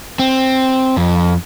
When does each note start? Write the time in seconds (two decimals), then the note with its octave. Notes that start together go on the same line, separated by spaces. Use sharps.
0.19 C4
0.97 F2